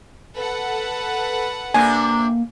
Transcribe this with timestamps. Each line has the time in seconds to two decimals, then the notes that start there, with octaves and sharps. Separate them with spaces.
0.35 A4 B4 F#5
1.74 C3 A#3 D4 G#5